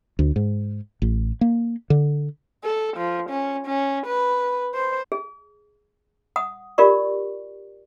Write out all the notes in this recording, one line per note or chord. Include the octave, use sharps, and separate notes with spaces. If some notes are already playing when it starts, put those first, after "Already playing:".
D2
G#2
A1
A#3
D3
A4
F3
C#4
C#4
B4
C5
G#4
F#5 D#6
F4 G4 A#4 D5 C#6